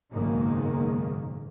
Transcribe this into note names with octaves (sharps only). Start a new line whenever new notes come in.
F#1 B1 G#2 D#3 A#3